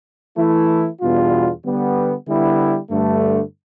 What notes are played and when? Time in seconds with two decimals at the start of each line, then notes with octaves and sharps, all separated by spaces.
0.36 E3 A3 E4
1.00 E2 B2 G3 D4 F4
1.64 D3 G3 B3
2.28 D3 G3 B3 E4
2.90 G2 D3 A3